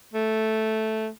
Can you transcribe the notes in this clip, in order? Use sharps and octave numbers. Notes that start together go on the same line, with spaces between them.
A3